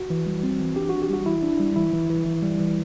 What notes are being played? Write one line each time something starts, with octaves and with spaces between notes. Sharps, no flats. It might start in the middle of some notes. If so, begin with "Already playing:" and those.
Already playing: F#4
E3
G3
C4
E3
D4 G4
D4 F#4
G4
G3 F#4
E3 E4
D4
G3
E3 E4
E3
E3
E3
G3
E3